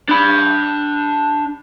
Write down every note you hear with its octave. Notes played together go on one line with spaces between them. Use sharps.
D4 B5